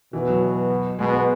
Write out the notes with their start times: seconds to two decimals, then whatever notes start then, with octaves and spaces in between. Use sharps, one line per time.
0.13 B2 E3
0.28 F#3
0.99 B2 G#3
1.13 B3